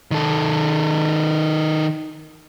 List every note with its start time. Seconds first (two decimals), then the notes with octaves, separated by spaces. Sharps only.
0.11 D#3 A4